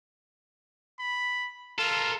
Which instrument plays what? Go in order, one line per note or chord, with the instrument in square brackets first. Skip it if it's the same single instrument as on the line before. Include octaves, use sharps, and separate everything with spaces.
[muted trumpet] B5
[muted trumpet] F4 [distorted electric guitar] A4 A#4